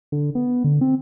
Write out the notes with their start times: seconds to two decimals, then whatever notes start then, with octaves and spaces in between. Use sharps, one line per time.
0.12 D3
0.35 B3
0.64 D3
0.81 C4